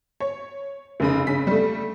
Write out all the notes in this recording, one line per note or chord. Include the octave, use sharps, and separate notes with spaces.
C#5
F1 C#3 B5
G2 C#3 B6
G3 A3